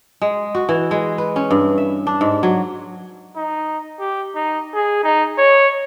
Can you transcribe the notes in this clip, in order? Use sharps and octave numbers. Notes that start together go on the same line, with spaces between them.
G#3
F#4
E3
G#3
B4
C#4
G2
E5
D4
G#2
F#3
D#4
G4
D#4
G#4
D#4
C#5